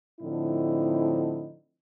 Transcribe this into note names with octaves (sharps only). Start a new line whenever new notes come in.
A2 D3 F3 C4 D#4 E4